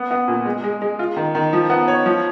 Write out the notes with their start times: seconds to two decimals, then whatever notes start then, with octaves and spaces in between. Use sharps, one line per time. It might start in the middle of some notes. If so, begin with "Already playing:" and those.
Already playing: B3
0.11 B3
0.28 A#2
0.45 G#3
0.64 G#3
0.82 G#3
0.99 F4
1.16 D#3
1.35 D#3
1.53 F3
1.70 B3
1.88 C#5
2.06 F3